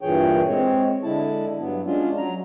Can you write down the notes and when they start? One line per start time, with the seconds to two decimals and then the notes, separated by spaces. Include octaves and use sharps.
0.01 G2 A#2 E3 G#4 C#5 G5
0.48 G#3 C4 C#5
1.03 D3 G#3 E4 A5
1.59 G2 F#3 B3
1.86 G#3 C#4 D4 F4
2.17 F#3 A#5